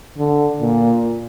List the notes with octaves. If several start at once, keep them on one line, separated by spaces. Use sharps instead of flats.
D3
A#2